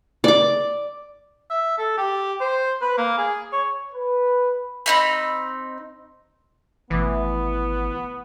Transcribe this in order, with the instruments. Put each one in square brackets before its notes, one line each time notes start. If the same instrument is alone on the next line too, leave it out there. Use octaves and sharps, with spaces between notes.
[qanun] D5 D6
[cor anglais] E5
A4
G4
C5
B4
A#3
G#4
C#5
[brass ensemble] B4
[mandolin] C4 D#4 B5
[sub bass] G#1 [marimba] B2 A3 D6 [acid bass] E3 [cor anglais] B3